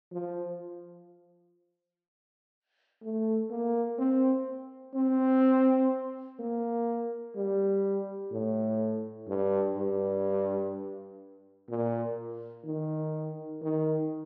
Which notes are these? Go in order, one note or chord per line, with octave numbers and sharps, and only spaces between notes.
F3
A3
A#3
C4
C4
A#3
G3
A2
G2
G2
A#2
D#3
D#3